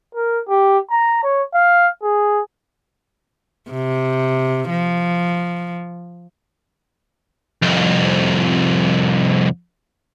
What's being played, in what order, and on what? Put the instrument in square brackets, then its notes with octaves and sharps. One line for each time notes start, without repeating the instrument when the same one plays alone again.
[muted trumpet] A#4
G4
A#5
C#5
F5
G#4
[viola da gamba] C3
F3
[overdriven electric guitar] C2 F2